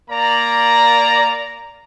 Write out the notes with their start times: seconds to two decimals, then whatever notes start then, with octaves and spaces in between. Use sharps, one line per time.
0.11 A#3 D5 A#5